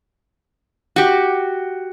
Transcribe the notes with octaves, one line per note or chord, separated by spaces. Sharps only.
F#4 G4